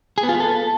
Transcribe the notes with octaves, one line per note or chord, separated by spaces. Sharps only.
G#4
B3
F4
B3
A4